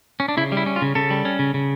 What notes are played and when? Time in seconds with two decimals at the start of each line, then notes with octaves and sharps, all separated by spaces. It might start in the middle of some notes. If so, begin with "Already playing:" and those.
0.20 C#4
0.28 D4
0.37 C#3 E4
0.52 G3
0.57 E4
0.66 C#4
0.76 F4
0.82 C#3
0.95 C#3 A4
1.10 G3
1.25 C#4
1.39 C#3
1.54 C#3